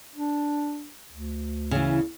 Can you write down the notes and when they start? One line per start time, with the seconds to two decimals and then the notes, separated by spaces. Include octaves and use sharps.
0.16 D4
1.12 D2
1.71 C#3 E3